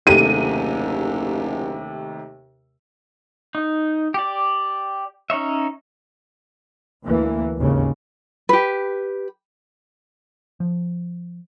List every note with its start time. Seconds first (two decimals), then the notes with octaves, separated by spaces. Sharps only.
0.07 F#1 D#2 C3 A3 D#7
3.55 D#4
4.14 G4 D5
5.30 C#4 D#4 C#5 E5
7.04 D2 E3 A#3
7.58 G#1 D#2 C#3
8.49 G4 B4
10.60 F3